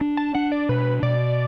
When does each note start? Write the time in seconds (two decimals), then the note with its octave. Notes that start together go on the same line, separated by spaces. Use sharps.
0.01 D4
0.17 A5
0.35 D4 F#5
0.52 D5
0.69 B2 B4
1.03 B2 D5